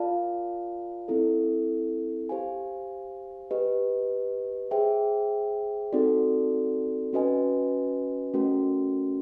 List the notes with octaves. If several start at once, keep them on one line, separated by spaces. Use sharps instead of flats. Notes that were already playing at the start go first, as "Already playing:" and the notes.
Already playing: F4 A#4 D5 F5 A5
C4 E4 A4
G4 C5 F5 G#5
G4 B4 D#5
G#4 C5 E5 G5
C4 D#4 F#4 A4 D5
C#4 F#4 B4 D#5 G#5
A3 C#4 F#4 A#4